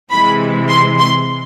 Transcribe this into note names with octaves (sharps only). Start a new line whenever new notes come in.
C3 E3 G#3 B5
C6
C6